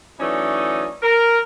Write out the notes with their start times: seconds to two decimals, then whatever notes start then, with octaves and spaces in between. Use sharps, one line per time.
0.19 E3 F#3 A3 C#4 D#4 D5
1.03 A#4